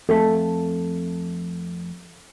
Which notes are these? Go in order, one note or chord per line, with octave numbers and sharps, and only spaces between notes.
F2 A3 A4